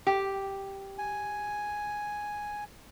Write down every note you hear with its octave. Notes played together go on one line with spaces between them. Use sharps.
G4
G#5